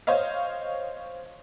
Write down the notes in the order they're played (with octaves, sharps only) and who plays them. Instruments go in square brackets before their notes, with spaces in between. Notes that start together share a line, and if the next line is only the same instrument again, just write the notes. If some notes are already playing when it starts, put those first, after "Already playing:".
[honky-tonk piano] C5 C#5 D#5 F5